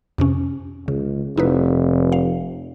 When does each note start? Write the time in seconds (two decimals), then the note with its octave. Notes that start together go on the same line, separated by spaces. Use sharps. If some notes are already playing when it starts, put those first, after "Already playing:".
0.18 F2 C3 C#4
0.88 C#2 C#3
1.38 F1 D#4 E4 B4
2.12 F5